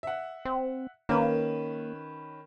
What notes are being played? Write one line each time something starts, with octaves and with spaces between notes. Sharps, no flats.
E5 F#5
C4
D#3 A#3 C#4 B4